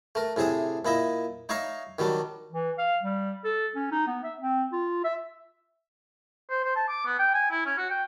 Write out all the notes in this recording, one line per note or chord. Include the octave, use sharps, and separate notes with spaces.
A3 A#4
A2 C3 G#4 E5 D#6
A#2 E4 D#5 E5
D#4 C#5 E5 F5 A#5 C#6
D#3 F#3 G3 D4
E3
F5
G3
A4
C#4
D#4
B3
E5
C4
F4
E5
C5
C5
A5
D6
B3
G5
G#5
E4
C#4
F#4
G5